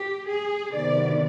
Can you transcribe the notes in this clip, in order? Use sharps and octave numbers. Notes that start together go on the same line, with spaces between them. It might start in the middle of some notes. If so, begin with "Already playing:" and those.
Already playing: G4
G#4
C3 D#3 F#3 B3 D5